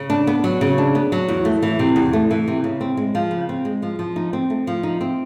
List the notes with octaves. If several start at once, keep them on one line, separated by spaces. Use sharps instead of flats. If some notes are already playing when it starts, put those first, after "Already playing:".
Already playing: C#3
D4
B3
F#3
C#3
D4
B3
F#3
E2
A3
E3
C3
E2
A3
E3
C3
C#3
C4
G#3
F3
C#3
C4
G#3
F3
F3
D#4
C4
A3
F3
D#4
C4